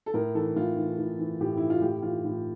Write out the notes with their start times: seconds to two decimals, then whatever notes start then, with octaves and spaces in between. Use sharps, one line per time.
0.06 A4
0.14 A2 A#4
0.35 E3 A4
0.56 A2 F4
0.76 E3
0.98 A2
1.19 E3
1.40 A2 G4
1.57 E3 E4
1.70 F4
1.82 A2 G4
2.02 E3 F4
2.25 A2